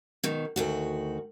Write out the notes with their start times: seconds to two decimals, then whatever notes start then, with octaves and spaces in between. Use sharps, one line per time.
0.24 B2 D#3
0.56 D2 D#3 F#4